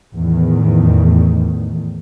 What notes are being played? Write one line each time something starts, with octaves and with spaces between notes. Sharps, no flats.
E2 A2 D#3